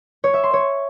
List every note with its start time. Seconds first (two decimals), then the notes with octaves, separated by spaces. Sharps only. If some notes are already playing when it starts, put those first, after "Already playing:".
0.24 C#5
0.34 E5
0.44 C6
0.53 C#5